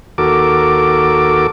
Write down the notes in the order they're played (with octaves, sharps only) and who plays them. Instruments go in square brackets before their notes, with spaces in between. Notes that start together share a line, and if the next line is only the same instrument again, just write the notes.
[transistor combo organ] D#2 F#4 A4 A#4 D6